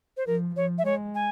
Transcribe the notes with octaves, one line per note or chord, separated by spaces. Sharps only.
C5
F3 A#4
F3 C#5
E5
G#3 C#5
G#5